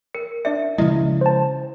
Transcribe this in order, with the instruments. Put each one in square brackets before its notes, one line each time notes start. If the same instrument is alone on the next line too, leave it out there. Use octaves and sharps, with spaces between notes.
[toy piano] A#4 [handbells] C#7
[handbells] D4 D5 C#7 [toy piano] E5
[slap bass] C#3 F3 G#3 [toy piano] E4 [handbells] D#5
[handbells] C5 A5